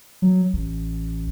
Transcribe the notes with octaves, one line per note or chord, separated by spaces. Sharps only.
F#3
A1